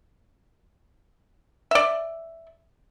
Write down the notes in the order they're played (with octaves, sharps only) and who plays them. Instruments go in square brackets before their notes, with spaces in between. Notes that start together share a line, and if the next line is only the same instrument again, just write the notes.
[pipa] D5 E5